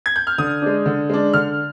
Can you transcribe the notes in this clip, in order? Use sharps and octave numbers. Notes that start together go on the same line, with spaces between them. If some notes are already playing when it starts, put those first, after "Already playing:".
G#6
G6
F6
D3 D#6
G#3 D4
D3
G#3 D4
D3 F6